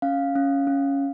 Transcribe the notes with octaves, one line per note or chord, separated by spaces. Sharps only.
C#4 F5
C#4
C#4